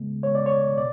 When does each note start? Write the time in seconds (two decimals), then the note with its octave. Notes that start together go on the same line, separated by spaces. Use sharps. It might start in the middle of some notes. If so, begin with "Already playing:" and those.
Already playing: C#3 G#3 B3
0.23 C#3 G#3 B3 C#5
0.35 D5
0.46 C#5
0.78 B2 D5